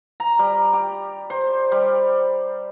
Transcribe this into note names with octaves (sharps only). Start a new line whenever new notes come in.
A#5
G3
G4
C5
G3